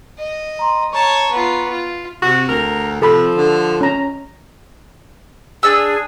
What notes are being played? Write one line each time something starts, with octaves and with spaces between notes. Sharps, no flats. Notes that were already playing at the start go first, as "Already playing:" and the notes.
D#5
A#5 C6
C#5 A5 A#5 C#6
B3 F4
F4
C3 F#4
D2 A#4
C3 F3 A4 B5
D3
C#4 A#5
D4 G#4 E6